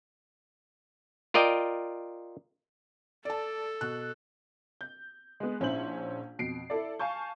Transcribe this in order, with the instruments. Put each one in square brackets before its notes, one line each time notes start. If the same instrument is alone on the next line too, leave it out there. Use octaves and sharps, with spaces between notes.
[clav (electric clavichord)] F4 A#4 D5 D#5 G5
[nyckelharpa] A4 [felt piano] D5 A5
[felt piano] B2 F#6
[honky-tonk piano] G6
G#3 B3
A#1 C#4 E4 C5 G6 F#7
F2 B2 C7 D7
E4 A4 D5
F5 G#5 A5 C#6 G6